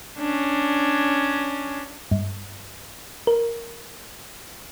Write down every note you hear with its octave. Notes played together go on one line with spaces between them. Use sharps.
C#4 D4
G2
A#4